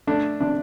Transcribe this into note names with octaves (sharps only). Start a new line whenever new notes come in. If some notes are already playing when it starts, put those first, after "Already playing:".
A3 D4
C3 D4